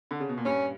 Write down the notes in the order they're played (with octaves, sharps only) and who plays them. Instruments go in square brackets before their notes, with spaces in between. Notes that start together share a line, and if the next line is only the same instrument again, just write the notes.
[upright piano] D3
C#3
B2
A#2
[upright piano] G2 [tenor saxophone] C#4